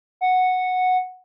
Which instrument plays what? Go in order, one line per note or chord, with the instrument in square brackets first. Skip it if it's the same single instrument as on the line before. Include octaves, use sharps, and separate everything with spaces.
[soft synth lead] F#5